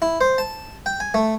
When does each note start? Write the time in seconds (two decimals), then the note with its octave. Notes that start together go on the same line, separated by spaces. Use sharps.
0.02 E4
0.21 C5
0.38 A5
0.86 G5
1.00 G#5
1.14 A3